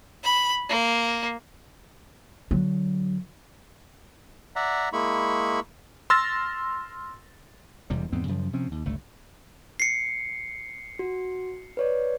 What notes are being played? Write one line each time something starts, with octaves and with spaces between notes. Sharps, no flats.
B5
A#3
D3 F#3
D5 E5 F#5 A#5
G#3 A#3 E4 B5 C#6
C6 E6 F6 A6 A#6
E1 E2 C3 G3
E2 G#2 B3 C4
F#2 C#3 F3
C3 F3 C4 C#4
D#2
G1 C#2 A3
C7 C#7
F#4
B4 C#5 D5